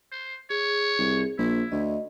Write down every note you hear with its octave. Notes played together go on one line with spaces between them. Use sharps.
C5
G#4 C#5
C2
A#1 E4
D2 D#5